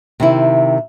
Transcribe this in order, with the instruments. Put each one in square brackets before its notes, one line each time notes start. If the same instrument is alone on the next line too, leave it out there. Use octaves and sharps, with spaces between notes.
[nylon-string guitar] C3 D#3 E4